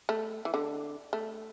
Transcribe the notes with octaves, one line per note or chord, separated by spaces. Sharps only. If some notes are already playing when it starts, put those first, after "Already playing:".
A3
E3
D3
A3